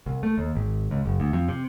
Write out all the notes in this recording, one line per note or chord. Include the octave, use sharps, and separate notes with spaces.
C2
A3
D#2
G#1
C#2
F#1
D2
F2
C3